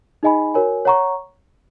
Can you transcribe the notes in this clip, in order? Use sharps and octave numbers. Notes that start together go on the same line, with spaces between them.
D#4 G#4 D#5 G#5 B5
F#4 A#4 C#5 G#5
C#5 F#5 A#5 C#6